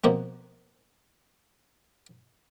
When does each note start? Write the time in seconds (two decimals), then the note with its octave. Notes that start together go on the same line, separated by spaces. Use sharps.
0.04 B2 F3 A#3 C4